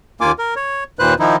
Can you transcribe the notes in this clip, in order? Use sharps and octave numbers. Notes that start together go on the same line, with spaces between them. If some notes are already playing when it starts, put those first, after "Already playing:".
D#2 A#3 F4 G#5 D6
A#4
C#5
D#2 A#2 B4 C5 F#6
D#3 F3 D#4 E4